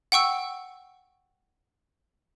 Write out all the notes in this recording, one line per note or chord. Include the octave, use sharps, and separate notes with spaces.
F#5 G5 C#6 E6